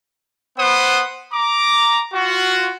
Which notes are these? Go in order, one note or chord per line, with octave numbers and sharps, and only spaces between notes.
B3 B4 C5 F#5 D#6
A#5 D6
F4 F#4